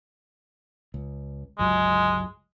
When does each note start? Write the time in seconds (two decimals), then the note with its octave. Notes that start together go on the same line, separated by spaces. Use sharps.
0.94 C#2
1.59 G1 C#2 F#3 G#3